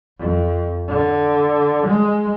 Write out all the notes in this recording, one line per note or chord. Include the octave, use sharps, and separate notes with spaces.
F2
D3
G#3